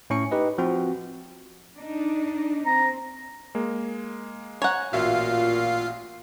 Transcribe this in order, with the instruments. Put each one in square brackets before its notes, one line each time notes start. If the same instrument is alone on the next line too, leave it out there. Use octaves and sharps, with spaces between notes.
[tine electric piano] A2 C#4 C#6 C#7
D#4 G4 B4 D#5
F3 C4 F#4
[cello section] D4 D#4
[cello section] C4 [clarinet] A#5
[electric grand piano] G#3 A#3
[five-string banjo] C#5 F#5 [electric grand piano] G#5 A#5
[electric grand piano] A1 F#4 E5 [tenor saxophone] A#2 [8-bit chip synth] F4 F5